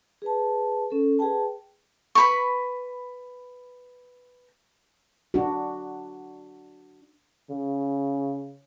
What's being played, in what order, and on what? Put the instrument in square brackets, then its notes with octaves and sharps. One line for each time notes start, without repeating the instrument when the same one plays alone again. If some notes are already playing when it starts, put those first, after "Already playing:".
[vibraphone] G#4 B4 A5
C#4 A4
G#4 B4 G5 A5
[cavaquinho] B4 B5 C#6
[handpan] D4 F#4
[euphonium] C#3